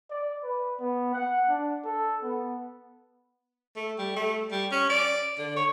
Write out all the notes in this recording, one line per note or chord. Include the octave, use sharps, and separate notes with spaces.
D5
B4
B3
F#5
D4
A4
B3
A3
G3
A3
G3
C#4
D5
D3
C#5